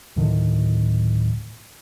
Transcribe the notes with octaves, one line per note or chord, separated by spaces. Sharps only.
D1 A2 D3 D#3